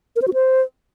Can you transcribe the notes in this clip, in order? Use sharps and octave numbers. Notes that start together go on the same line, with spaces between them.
A#4
C5
F#4
C5